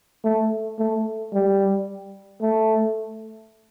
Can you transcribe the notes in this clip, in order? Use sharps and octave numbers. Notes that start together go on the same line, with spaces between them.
A3
A3
G3
A3